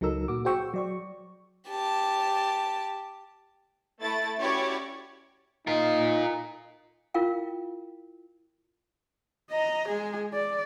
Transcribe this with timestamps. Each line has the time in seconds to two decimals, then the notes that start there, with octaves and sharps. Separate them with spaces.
0.01 C#2 F#3 D#4 A4 A#4 E6
0.28 A#2 F#4 D6
0.45 F#4 G#4 C5 G5 C#6 E6
0.74 F#3 D5 C#6
1.69 G4 A5
4.02 A3 E4 A6
4.39 C#4 E4 F#4 G4 C#5 D5
5.67 D#4 F4 A#4
7.14 E4 F4 A#4 F5 G5
9.51 D#5 A#5
9.88 G#3 G#4
10.33 D5